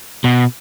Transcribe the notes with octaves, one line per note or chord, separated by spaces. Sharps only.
B2